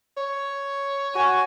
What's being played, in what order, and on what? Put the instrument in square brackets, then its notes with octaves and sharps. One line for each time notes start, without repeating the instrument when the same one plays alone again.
[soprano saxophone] C#5
[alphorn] F#4 [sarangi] G#5